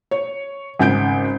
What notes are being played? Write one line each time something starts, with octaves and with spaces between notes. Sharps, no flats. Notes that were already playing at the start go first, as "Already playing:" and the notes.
C#5
G#1 C#3 G#5 G6 D7